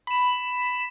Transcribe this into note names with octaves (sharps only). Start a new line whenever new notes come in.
B5 E7